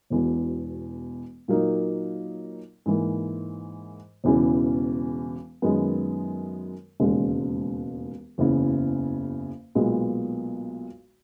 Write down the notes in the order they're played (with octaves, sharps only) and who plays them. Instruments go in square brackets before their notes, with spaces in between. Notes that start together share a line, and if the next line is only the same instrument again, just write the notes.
[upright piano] E1 E2 B2
A#2 F#3 A#3 D#4 A#4
G#2 E3 A#3
E1 E2 C#3 E3
F#2 D#3 G#3 B3
E1 D#2 C#3 G#3
F#1 E2 C#3
B1 A#2 G#3 B3